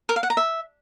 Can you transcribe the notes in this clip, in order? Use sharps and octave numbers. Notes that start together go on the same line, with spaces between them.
A#4
F5
F#5
A#5
E5